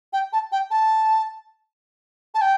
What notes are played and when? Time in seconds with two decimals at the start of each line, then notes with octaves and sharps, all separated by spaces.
0.13 G5
0.33 A5
0.52 G5
0.71 A5
2.35 A5
2.41 G5